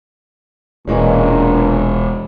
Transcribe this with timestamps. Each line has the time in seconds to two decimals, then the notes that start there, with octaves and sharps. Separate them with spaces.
0.87 E1 A#2 E3 G#3 C#4